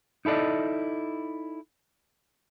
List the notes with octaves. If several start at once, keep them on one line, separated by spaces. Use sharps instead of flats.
D#4 E4 A4 D5 D#5